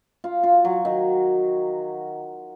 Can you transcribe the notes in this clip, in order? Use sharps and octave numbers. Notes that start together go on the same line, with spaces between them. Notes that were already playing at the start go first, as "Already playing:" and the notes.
F4
F4
F#3
D#3